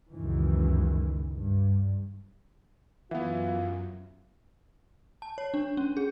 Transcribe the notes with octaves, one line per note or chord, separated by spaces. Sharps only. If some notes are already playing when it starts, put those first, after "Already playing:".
C#2 F#2 D#3 E3
G2
F#2 E3 B3 F4 E5 F#5
A5
C#5
D4
C#4
G#4